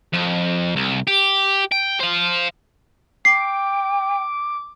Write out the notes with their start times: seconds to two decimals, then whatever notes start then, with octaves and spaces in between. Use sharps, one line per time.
0.13 F2
0.76 C2
1.07 G4
1.72 G5
2.00 C5 F5
3.25 G5 D6 C7